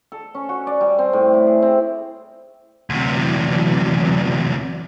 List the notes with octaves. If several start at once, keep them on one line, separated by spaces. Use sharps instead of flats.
A4
C#4
F#4
D5
G3
C4
A2
E4
G#4
C4
D2 C3 E3 F#3 D5